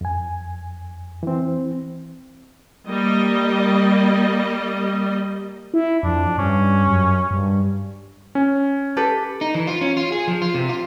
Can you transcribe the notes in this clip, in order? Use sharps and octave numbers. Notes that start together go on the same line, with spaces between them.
F2 G#5
E3 C4
G3 A#3 D#5
E4
F2 D4
G2 C#4
F#2
G2
C#4
G4 A4 B4
D#4
E3
F4
C#4
F4
G#4
F3
F4
C3
F4